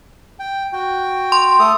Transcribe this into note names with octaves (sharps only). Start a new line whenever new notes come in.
G5
F#4 G5
C6
A3 A4 D#6